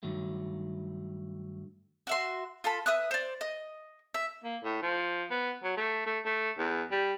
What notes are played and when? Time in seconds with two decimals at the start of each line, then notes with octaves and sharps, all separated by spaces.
0.03 G2 D#3 F#3 A3
2.07 F#4 E5 C6
2.64 F4 A4 A5 B5
2.86 B4 E5 D#6 F#6
3.11 C5 D5
3.41 D#5
4.14 E5
4.44 A#3
4.64 A2
4.82 F3
5.30 B3
5.63 F#3
5.77 A3
6.06 A3
6.25 A3
6.58 E2
6.91 G3